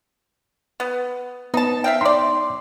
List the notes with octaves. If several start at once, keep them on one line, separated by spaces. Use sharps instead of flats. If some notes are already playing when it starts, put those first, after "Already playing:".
B3
B3 D#4 A5
E5 F5 G5
D#4 D5 C6 D6